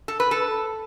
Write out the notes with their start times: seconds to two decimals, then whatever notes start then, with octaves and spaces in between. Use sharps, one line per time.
0.08 A4
0.20 B4
0.31 A4